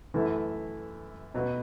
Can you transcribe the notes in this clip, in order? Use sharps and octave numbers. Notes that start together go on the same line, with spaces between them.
F#2 E3 A3 E4
B2 F#3 B3 F#4